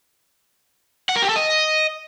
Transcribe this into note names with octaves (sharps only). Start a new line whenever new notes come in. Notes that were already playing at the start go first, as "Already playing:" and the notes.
F#5
A#4
G4
A4
D#5